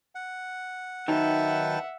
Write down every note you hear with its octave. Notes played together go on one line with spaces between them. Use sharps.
F#5
D#3 F#3 D#4 B4 E5 F#5 G5 A5